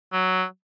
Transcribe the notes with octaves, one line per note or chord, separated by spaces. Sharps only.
F#3